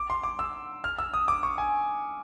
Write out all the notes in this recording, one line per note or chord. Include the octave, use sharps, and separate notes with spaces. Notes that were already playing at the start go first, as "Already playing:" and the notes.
Already playing: D6
C6
D6
E6
F6
E6
D#6
D6
C#6
G#5